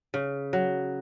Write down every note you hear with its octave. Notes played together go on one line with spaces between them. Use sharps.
C#3
F#3